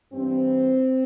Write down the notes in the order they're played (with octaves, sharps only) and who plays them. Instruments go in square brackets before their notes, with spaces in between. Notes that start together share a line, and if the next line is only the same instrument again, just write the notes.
[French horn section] G2 E3 C4